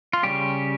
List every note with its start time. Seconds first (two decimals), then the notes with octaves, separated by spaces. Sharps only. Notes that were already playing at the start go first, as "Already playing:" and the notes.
0.13 F4
0.23 C#3 G3 C#4 G4